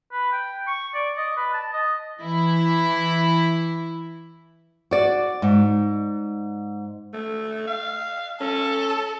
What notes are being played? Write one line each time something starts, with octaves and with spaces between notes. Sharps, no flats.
B4
G5
C#6
D5
D#5
B4
A5
D#5
E3 E4
F#4 D5
G#2
A3
F5
C#4 A4